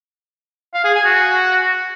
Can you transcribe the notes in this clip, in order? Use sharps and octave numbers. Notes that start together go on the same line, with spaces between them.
F5
G#4
G#5
F#4